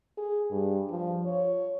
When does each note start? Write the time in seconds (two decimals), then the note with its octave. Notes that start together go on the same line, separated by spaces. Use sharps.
0.18 G#4
0.51 G2
0.90 F3
1.26 C#5